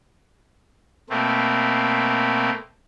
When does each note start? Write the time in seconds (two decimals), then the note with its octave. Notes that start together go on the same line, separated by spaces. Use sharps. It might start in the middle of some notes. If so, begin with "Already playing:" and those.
1.10 B2 A3 A#3 C4